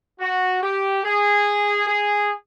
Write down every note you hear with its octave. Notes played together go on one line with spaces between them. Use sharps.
F#4
G4
G#4
G#4